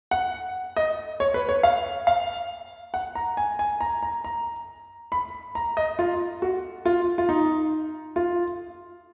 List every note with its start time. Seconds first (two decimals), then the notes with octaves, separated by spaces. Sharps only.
0.11 F#5
0.77 D#5
1.20 C#5
1.34 B4
1.49 C#5
1.63 F5
2.07 F5
2.94 F#5
3.15 A#5
3.37 G#5
3.59 G#5
3.81 A#5
4.03 A#5
4.24 A#5
5.12 B5
5.55 A#5
5.77 D#5
5.99 F4
6.42 F#4
6.85 F4
7.18 F4
7.29 D#4
8.16 F4